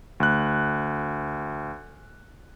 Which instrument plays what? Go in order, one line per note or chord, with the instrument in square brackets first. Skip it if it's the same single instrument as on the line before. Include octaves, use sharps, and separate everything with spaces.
[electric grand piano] D2 F#6